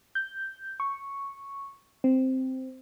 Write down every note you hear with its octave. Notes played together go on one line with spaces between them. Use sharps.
G6
C#6
C4